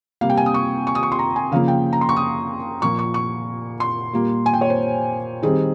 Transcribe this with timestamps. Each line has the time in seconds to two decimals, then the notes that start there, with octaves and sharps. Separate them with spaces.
0.21 C3 G3 A#3 F5
0.30 G5
0.37 G#5
0.46 D#6
0.54 C#6
0.87 C#6
0.95 D#6
1.03 C#6
1.12 C6
1.19 A#5
1.36 G#5
1.52 C#3 F3 A#3 F5
1.68 G5
1.93 A#5
2.01 C6
2.09 C#6
2.16 D#6
2.82 A#2 F3 A#3 C#6
2.99 C#6
3.14 C#6
3.80 C6
4.13 A#2 G3 A#3
4.46 G#5
4.54 G5
4.61 C#5
4.70 C5
5.42 D#3 G3 C4 G#4